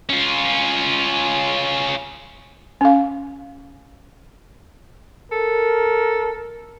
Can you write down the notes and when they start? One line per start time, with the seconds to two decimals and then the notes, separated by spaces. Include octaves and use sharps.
0.09 C#4 F4
2.81 C#4 F5
5.31 A4 A#4